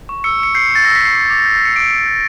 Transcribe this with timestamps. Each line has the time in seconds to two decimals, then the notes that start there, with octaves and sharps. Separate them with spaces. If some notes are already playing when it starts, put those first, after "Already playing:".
0.09 C#6
0.24 E6 C#7
0.39 C#6 C#7
0.55 G6 C7
0.70 C#6
0.75 A6
0.85 E6 A#6
0.95 B6
1.01 C#6 C7
1.15 D6 C#7
1.30 D6
1.45 G6
1.61 G6 C#7
1.76 D6 D7
1.91 D6
2.06 G6